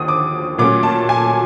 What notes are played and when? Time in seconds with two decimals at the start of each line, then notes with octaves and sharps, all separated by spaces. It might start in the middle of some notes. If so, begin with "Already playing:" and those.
Already playing: D#2 D3 F3 D#6
0.08 D6
0.58 A#2 F#3 A3 C#4 D6
0.83 A5
1.09 G#5